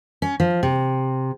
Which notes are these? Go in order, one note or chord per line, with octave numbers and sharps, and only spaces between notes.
C#4
F3
C3